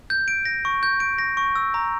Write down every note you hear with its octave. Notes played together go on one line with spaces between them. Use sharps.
G6
D7
A#6
C#6
G6
D7
A#6
C#6
E6
A#5